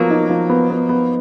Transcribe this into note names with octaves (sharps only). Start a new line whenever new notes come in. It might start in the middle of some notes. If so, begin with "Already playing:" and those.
Already playing: F3 F#3 A#3 B3
D#4
F3
B3
B3
B3